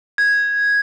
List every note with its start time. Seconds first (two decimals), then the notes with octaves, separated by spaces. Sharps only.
0.18 G#6